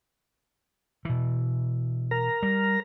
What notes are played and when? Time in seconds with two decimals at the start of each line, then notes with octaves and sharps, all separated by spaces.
1.05 B2 E3
2.11 A#4 A#5
2.43 G3